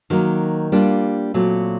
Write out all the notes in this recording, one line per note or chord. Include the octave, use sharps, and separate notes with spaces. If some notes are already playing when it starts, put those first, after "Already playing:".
D#3 F#3 A#3 D#4
G3 A#3 D4 F4
A#2 F#3 A3 C4